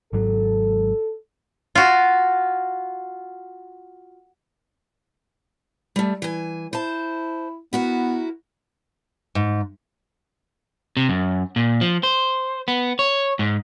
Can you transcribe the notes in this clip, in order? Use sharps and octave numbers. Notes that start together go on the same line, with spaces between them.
G#1 G#2 F#3 A4
F4 F#4
G3 A3
E3 G#5
E4 C5 A5
B3 E4 F#4 A#4
G#2
C3
F#2
A#2
F3
C5
B3
C#5
G#2